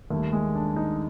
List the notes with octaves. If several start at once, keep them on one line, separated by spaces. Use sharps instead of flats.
D#2 D#3 G3 A3
G#3
D4
D#4